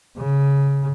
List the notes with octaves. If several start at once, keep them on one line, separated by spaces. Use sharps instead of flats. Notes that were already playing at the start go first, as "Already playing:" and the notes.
C#3